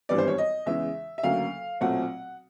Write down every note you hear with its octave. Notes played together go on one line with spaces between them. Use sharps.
G#1 G2 E3 G3 B3 D5
C5
C#5
D#5
E2 C#3 E3 G#3 E5
E5
D2 C#3 F#3 A#3 F5
B1 A#2 F#3 A3 C4 F#5